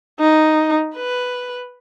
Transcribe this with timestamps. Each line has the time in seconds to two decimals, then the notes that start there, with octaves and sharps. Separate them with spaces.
0.20 D#4
0.95 B4